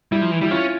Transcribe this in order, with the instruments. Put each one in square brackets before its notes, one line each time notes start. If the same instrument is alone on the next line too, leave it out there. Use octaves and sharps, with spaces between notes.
[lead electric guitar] G3 [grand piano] E4
[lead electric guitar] F3
E3
[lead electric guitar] G3 [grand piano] E4
[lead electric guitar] C#4 [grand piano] F4